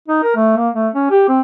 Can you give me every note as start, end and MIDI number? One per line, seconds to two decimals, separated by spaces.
0.08 0.20 63
0.23 0.31 70
0.36 0.52 57
0.57 0.69 58
0.74 0.88 57
0.94 1.06 61
1.11 1.27 67
1.28 1.41 60